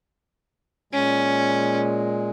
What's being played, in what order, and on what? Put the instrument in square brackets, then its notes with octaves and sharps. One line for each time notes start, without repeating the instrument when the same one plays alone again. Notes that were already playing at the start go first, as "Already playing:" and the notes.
[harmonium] A#2 G#3 [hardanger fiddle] C#4